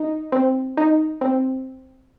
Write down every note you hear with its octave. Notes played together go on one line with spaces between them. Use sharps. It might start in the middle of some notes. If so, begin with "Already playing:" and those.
Already playing: D#4
C4
D#4
C4